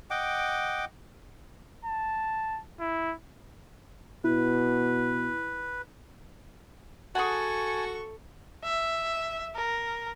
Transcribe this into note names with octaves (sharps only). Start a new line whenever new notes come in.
D#5 F#5 G5 D6
A5
E4
B2 E4 B4
F#4 G#4 A4 F#5 G#5 A5 C#6
E5
A#4